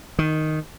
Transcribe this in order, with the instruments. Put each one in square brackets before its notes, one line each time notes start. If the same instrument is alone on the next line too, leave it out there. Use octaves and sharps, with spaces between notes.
[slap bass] D#3